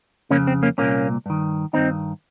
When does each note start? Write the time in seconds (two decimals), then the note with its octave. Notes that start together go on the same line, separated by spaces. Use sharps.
0.30 F2 C#3 A#3 C#4
0.47 C4
0.63 A#3 C#4
0.78 C2 A#2 A#3 C#4
1.26 G2 D#3
1.73 G2 D#3 C4 D#4